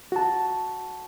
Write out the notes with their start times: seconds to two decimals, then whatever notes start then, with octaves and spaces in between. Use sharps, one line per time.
0.12 F#4 A5